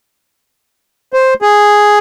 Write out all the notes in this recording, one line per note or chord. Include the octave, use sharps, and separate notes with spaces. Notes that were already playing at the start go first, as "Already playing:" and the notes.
C5
G#4